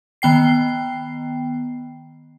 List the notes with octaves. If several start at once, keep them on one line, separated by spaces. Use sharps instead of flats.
D#3 B3 G5 C7